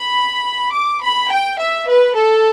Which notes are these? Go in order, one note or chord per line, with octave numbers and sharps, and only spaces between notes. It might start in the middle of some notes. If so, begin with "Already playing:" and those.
Already playing: B5
D6
B5
G5
E5
B4
A4